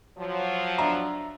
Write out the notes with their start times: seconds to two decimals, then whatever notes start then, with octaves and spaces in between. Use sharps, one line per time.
0.18 F3 F#3
0.78 D4 E5 A#5